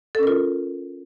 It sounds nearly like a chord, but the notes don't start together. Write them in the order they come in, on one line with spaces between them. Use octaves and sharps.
A4 C#4 A#4 F4